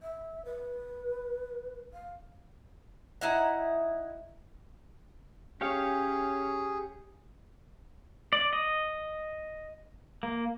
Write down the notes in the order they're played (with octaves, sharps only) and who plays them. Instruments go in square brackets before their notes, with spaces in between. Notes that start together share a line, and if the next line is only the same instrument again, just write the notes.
[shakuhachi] E5
B4
F5
[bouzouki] D#4 E4 F#5
[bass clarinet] C#4 [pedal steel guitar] G4 C#5 F5 [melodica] G#4
[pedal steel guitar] D5
D#5
A#3